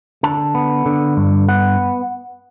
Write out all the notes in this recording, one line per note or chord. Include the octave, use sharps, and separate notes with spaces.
D3 A5
B3
D3
G2
B3 F#5